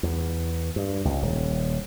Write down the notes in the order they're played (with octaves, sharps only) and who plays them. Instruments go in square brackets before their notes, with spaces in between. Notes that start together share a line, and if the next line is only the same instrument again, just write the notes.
[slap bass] E2
G2
C#2
D#1